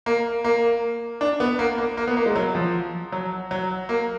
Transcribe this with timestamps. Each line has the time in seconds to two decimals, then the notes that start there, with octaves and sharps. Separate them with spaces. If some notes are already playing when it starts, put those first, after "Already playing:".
0.06 A#3
0.44 A#3
1.21 D4
1.40 B3
1.59 A#3
1.78 A#3
1.97 A#3
2.07 B3
2.17 A#3
2.26 G#3
2.36 F#3
2.55 F3
3.12 F#3
3.51 F#3
3.89 A#3